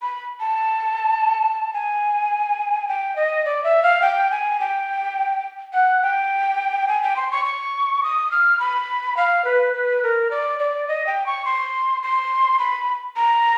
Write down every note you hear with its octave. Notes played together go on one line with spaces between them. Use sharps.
B5
A5
G#5
G5
D#5
D5
E5
F5
G5
G#5
G5
F#5
G5
G#5
G5
C6
C#6
C#6
D#6
F6
B5
F5
B4
B4
A#4
D5
D5
D#5
G5
C#6
C6
C6
B5
A#5